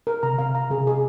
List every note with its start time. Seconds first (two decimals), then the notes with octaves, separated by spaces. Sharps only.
0.07 A#4
0.23 C3 A#5
0.39 C3 F5
0.55 A#5
0.70 C3 G#4
0.87 G#4